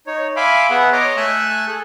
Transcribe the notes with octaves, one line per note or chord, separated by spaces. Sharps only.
D#4 C#5
E5 F5 G#5 B5 C6 D6
B3 G#4 E5 F#5
C#5 D#5 A#5 C6 D6
A3 A4 E5 G#5 E6 F#6
G#4 A4